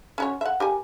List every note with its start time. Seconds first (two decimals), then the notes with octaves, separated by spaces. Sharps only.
0.18 C#4 F#4 C#5
0.41 E5 F#5
0.60 G4 A#4 G#5